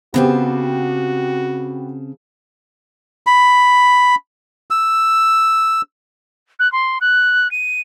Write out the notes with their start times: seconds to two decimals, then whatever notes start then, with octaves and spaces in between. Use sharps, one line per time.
0.14 C#3 B3 C4 F#4 G4 A4
3.27 B5
4.71 E6
6.60 F#6
6.72 C6
7.01 F#6
7.51 D#7